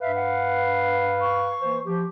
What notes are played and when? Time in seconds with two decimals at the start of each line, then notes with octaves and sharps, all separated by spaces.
0.01 G2 B4 E5 F5
0.15 F#5
1.21 C#6
1.62 E3 A#3 C5
1.86 F3 G4